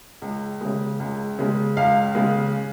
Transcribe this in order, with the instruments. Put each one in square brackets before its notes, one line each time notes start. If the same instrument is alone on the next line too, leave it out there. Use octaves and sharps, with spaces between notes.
[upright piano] C#2
C#3 G#3
C#2
C#3 G#3
C#2 F5
C#3 G#3